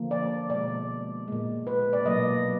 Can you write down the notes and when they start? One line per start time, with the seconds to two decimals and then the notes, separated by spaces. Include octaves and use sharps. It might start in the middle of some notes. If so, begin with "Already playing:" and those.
Already playing: D3 F3 A#3
0.11 D5
0.50 B2 G#3 D5
1.28 A#2 G#3
1.67 B4
1.93 D5
2.05 B2 F#3 A#3 D#5